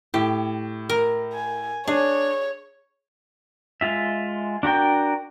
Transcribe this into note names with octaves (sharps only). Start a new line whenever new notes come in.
A2 G4
A#4
G#5
D4 G#4 C#5
G#3 F4 E5
D4 F#4 A#4 G5